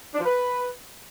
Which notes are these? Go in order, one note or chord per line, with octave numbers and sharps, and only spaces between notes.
D4
F3
B4